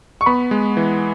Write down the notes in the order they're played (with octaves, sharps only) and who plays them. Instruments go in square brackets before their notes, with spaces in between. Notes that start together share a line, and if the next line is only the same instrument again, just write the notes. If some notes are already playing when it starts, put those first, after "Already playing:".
[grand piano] C#6
[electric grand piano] B3 [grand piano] B5
[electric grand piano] G#3
E3